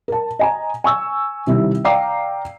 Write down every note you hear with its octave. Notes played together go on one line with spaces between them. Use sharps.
A#4 A5
D#5 G#5 A#5
G#5 C#6 E6
C3 D#3 G3 E4
D5 F5 G5 A#5 D6 C7